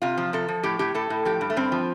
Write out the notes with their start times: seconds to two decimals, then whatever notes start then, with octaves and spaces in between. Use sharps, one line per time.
0.02 C3 F4
0.17 F3
0.33 C3 A4
0.48 F3
0.63 A2 G4
0.79 A2 G4
0.95 A2 A4
1.10 A2
1.25 F3 G4
1.41 G2
1.50 A3
1.57 G2 C4
1.72 F3